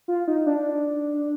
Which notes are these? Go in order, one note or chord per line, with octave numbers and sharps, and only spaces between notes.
F4
D#4
D4